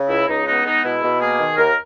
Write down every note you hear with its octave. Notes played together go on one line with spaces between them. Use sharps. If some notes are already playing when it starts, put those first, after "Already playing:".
Already playing: C#3
C#2 E4
C#2 D#4
B3 D#4
G#3 D#4
B2 E4
B2
A#3 G#4
D#3
D#2 A#4